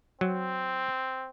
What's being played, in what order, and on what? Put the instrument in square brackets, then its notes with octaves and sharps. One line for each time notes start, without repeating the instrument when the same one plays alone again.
[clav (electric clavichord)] F#3 [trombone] C4